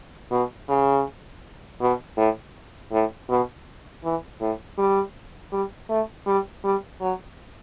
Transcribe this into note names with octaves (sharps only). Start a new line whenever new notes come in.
B2
C#3
B2
A2
A2
B2
E3
A2
G3
G3
A3
G3
G3
F#3